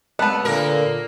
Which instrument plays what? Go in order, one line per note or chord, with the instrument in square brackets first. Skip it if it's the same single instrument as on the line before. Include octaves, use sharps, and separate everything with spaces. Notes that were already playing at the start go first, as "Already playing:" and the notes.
[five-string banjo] A3 B3 [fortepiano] A5 B5 F#6
[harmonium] A#2 D3 [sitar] A#3 A#4